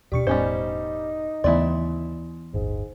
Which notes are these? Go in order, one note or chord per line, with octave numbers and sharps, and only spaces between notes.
D#2 B2 G3 D4 G4 C#6 C#7
E1 A2 G3 B3 C#4 D#4 C5
D#2 C#3 E3 A3 B3 E4 D5 C6
D1 G1 G#2